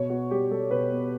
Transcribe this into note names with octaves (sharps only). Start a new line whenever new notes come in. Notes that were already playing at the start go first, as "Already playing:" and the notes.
Already playing: B2 C#5
B3 F#4
G3 G4
G3 A4
B2 B4
B3